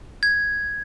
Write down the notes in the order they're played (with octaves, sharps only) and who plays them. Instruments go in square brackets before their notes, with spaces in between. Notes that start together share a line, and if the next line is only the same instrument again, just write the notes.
[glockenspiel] G#6